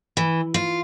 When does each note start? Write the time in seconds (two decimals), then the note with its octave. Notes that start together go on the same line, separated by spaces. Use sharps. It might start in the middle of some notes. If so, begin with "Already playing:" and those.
0.17 E3
0.54 F4